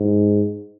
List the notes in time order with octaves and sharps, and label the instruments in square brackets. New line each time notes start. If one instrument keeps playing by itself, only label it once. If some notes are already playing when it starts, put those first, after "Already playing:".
Already playing: [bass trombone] G#2